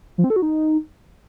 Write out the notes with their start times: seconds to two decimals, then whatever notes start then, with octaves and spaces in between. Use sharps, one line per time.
0.18 F3
0.24 C4
0.30 A4
0.36 F#4
0.42 D#4